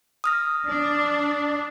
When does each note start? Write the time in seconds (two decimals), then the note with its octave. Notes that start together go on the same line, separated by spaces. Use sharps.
0.24 D#6 F6 A#6
0.67 D4